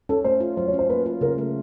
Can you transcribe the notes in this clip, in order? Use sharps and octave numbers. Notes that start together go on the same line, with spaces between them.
C#4 A4
A3 C5
F4
F#3 C5
C#5
C#4
C5
A#3 B4
F4
C#3 A#4
A3